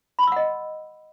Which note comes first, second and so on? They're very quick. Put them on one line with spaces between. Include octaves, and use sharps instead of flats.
B5 C6 E6 F#5 D#5